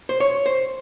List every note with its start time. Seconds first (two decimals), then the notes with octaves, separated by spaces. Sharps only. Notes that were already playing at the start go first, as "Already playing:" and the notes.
0.09 C5
0.20 C#5
0.46 C5